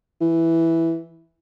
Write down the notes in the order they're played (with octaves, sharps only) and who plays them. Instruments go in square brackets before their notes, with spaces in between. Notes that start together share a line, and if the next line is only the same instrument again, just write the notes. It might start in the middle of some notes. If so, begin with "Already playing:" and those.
[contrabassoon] E3